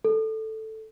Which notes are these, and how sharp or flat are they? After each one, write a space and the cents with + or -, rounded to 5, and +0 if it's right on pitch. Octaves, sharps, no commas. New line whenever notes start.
A4 +0